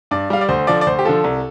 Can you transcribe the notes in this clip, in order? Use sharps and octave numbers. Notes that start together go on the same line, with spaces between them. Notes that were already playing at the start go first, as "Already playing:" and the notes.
G2 D5
G3 F5
D5
D2 C5
D3 F3 D5
D5
D2 C5
G4
D3 F3 A4
C2